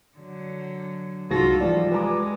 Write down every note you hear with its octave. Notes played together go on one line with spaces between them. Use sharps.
D3 F#3
C2 G#2 F#3 F4 F#4 A4 A#6
E3 F3 G3 F4 D5
G#3 B4 G#5 A#5 D6